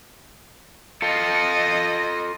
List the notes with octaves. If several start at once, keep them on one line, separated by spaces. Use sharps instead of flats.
F4 A4 D#5